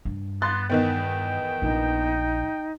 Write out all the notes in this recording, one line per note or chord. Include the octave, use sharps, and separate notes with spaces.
G2
B3 C6 F#6 A6
E2 D#3 B3 G5
A#1 A#3 D#4